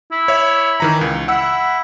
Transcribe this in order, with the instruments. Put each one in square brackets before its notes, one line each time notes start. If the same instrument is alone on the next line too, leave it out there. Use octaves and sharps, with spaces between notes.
[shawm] E4
[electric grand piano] C#5 E5
D#3 E3 A#5
C#2
[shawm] E4 [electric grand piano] F#5 E6